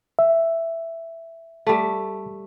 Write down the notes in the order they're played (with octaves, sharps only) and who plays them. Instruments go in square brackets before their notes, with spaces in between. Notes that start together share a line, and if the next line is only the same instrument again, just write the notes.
[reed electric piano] E5
[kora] G3 A3